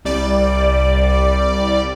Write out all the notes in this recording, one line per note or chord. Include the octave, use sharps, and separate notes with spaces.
C2 G3 D5